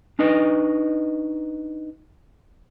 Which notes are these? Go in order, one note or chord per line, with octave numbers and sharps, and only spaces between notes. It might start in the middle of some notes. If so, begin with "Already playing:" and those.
D4 D#4 B4 D#5